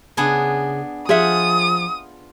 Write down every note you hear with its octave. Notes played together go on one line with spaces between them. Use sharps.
C#3 B3 D4 G#4
F3 F4 G#4 E5 F#5 D#6